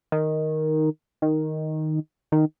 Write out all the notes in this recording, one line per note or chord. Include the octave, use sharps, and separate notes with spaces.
D#3
D#3
D#3